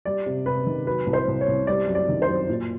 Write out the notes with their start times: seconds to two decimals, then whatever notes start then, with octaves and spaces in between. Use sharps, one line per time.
0.05 G3 D5
0.26 C3
0.46 C3 B4
0.67 D#3
0.86 F#3 B4
1.06 C2
1.13 C5
1.28 C2
1.41 C#5
1.48 C2
1.67 G3 D5
1.87 F#2
1.95 D5
2.09 D#3
2.22 C5
2.29 F#2
2.49 A#2